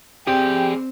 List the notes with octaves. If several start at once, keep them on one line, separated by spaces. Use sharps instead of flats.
C4 G4 G#4 D5 G5